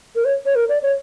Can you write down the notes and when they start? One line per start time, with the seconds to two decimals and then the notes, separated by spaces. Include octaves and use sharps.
0.15 A#4
0.25 C#5
0.46 C#5
0.55 A#4
0.69 D5
0.83 C#5